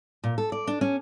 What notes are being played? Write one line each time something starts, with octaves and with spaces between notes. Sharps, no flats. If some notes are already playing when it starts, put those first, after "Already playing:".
A#2
A4
D5
D4
C#4